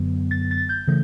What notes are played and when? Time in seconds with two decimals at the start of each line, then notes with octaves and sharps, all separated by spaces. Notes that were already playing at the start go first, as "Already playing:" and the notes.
Already playing: F#2 D3 F#3 B3
0.31 A6
0.51 A6
0.69 G6
0.87 C#3 E3 A3